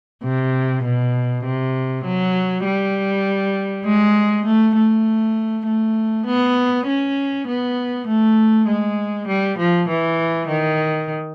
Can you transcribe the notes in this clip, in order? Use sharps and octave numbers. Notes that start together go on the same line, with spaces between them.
C3
B2
C3
F#3
G3
G#3
A3
A3
A3
B3
C#4
B3
A3
G#3
G3
F3
E3
D#3